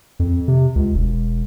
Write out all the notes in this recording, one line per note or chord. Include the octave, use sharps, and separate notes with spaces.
F2
C3
C#2
E1